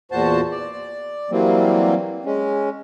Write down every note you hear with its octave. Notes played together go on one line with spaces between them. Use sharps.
E2 A#2 F#4 C5 A5
D5
E3 F#3 G3 A#3 C4
G#3 C#4